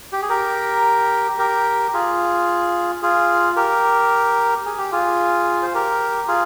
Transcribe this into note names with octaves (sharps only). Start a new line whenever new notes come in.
G4
G#4
G4 A#4
G4 A#4
F4 G#4
F4 G#4
G4 A#4
G#4
G4
F4 G#4
C5
G4 A#4
F4 G#4